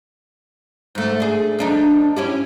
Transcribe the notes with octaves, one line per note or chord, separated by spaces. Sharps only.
G#2 A3
D4 G#4
F2 D4 D#4
C#4 E4 G4